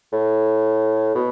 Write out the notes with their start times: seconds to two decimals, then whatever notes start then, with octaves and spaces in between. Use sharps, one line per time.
0.13 A2
1.15 B2